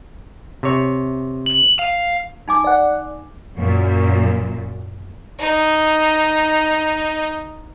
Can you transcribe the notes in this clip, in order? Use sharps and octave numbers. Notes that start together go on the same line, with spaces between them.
C3 C#5
F#7
F5
D#4 G#5 D6
D5 F#5
F#2 A#2
D#4 D#5